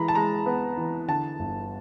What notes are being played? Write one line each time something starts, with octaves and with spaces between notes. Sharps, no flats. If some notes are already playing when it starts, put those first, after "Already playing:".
Already playing: E3 G#3 A#5 B5
A5
G#3 A#5
B3
E3
D3 A5
G1